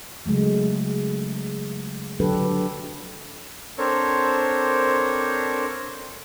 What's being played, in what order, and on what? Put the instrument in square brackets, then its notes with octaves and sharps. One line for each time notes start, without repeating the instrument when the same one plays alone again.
[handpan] C#3 F#3 G#3 A3
D3 F#3 D4 G4 A4 B4
[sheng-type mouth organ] C4 D4 A4 A#4 C5 C#5